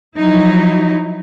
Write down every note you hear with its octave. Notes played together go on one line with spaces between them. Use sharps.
F3 F#3 D#4 E4